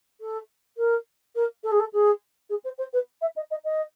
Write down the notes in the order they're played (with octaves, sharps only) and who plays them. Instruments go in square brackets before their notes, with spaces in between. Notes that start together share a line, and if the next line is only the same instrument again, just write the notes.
[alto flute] A4
A#4
A#4
A4
G#4
A4
G#4
G#4
C5
C5
B4
E5
D#5
D#5
D#5